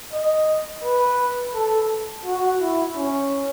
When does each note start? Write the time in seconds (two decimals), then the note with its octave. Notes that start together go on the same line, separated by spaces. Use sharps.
0.13 D#5
0.84 B4
1.54 A4
2.26 F#4
2.60 E4
2.96 C#4